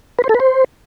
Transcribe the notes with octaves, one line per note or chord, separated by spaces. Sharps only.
B4
C5
A4
B4
C5